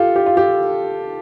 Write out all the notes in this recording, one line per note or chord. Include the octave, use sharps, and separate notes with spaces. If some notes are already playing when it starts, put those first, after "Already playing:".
Already playing: F4 G4 A4
G4
F4
G4